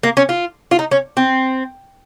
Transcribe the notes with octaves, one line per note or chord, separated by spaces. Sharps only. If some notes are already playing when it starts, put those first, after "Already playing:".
A#3
C#4
F4
F4
D#4
C#4
C4